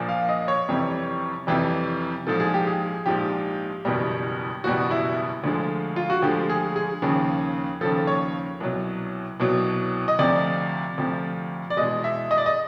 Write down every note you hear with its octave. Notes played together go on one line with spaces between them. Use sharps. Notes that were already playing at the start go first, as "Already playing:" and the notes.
Already playing: A#1 A#2 F3
F5
D#5
C#5
F2 C3 E3 G3
F2 C3 E3 G3
A#1 G#2 F3 A4
G#4
G4
G#4
A#1 G#2 F3 G4
F#1 E2 B2 G3
F#1 E2 B2 G3 F#4
E4
D2 D3 F3 G#3
F4
F#4
D2 D3 F3 G#3 G4
G#4
G#4
D#2 C#3 F3
D#2 C#3 F3 A4
C#5
C2 B2 F#3
C2 B2 F#3
D#5
D2 C3 F3 D5
D2 C3 F3
D5
E2 B2 G#3 D#5
E5
D#5
D5
D#5